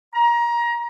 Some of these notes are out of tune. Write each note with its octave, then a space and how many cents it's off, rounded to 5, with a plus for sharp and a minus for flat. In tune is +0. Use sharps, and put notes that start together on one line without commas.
A#5 +25